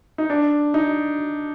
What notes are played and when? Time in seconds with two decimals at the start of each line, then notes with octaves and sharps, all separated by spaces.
0.18 D#4
0.30 D4
0.74 D#4